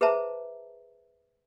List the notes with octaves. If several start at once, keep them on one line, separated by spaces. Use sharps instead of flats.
G#4 B4 C5 E5 A5 A#5